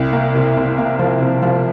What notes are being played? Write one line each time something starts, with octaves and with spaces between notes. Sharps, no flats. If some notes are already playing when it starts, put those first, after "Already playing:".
Already playing: C2
A#3
C3
C2
A#3
F3
C3
F3